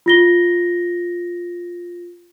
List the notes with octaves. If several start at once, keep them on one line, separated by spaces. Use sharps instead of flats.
F4 A#6 G7